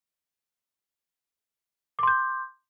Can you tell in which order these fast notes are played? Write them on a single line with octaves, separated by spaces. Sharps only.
D6 C6 G6